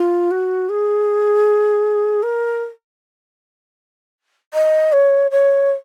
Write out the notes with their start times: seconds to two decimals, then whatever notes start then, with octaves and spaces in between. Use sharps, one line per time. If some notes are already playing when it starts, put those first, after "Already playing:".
Already playing: F4
0.31 F#4
0.69 G#4
2.23 A#4
4.54 D#5
4.92 C#5
5.31 C#5